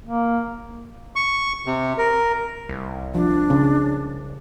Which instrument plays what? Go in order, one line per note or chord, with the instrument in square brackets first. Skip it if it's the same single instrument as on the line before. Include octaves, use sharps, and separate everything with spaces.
[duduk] A#3
[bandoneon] C#6
C3
A#4
[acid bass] C2
[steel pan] F3 [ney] D4
[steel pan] C#3 C#4